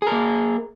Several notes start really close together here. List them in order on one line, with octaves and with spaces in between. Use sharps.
G#4 A#4 A#3